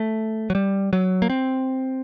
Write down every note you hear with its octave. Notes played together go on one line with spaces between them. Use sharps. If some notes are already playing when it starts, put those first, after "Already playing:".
Already playing: A3
F#3
G3
F#3
A#3
C4